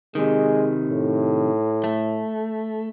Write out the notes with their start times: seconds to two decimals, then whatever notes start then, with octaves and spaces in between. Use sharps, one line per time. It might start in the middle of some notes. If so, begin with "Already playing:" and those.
0.15 C3 D#3 G#3
0.89 A2
1.84 A3